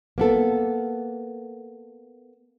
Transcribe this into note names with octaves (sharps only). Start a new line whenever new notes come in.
A#3 B3 A4